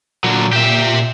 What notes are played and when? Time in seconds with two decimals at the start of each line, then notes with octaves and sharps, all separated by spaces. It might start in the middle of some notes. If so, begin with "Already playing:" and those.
0.24 A#2 D3 F#3
0.53 G4 E5